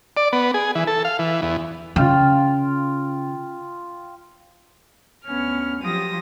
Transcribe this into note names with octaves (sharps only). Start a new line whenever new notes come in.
D5
B3
G#4
E3
A4
F5
E3
E2
C#3 F4 F5 G5
D2 B3 C#4 F6
F3 F#3 F4 G4 D#6 A#6